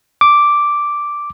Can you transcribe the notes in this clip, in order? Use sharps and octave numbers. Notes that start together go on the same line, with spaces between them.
D6